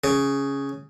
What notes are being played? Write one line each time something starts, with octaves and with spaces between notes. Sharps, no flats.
C#3